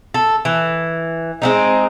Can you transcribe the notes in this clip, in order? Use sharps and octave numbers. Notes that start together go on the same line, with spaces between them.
A4
E3
G#3 C4 D#4